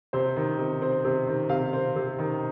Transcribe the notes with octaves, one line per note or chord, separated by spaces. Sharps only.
C3 C5
D#3
C3
C4
C3
D#3
C3 F5
C4
C3
D#3